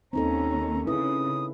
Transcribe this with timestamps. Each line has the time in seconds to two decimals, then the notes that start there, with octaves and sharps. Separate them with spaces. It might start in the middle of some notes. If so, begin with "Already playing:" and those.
0.13 D#2 C4 C#4 D#4 A4 A#5
0.87 C#3 E4 B4 D#6